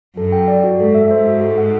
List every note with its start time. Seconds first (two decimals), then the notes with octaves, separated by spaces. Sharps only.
0.17 F#2 A4
0.32 G5
0.48 D5
0.64 F#4
0.79 G#2 A4
0.94 E5
1.11 G#2 C5
1.26 F#4
1.41 A4
1.58 F#5